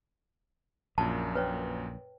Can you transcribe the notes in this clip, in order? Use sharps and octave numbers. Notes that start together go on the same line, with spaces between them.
A#1 F#2 A#2 A5
B4 C#5 G5